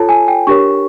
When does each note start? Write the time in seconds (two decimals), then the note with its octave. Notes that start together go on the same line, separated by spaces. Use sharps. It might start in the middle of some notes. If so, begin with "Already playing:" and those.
Already playing: F4 A4 C#5 A5
0.09 G#5
0.28 G5
0.47 D4 G4 A#4 C#5 C#6